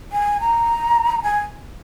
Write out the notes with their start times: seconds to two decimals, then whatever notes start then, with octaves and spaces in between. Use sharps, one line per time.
0.12 G#5
0.40 A#5
1.24 G#5